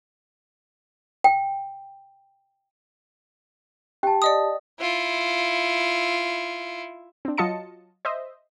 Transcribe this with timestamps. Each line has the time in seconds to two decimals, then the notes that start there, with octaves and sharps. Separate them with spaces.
1.24 G5
4.03 G4 G5 A5
4.22 D5 D#5 D#6
4.80 E4 F4
7.25 C4 D4
7.38 F#3 F4 D#5 A5 C#7
8.05 C5 D#5 E5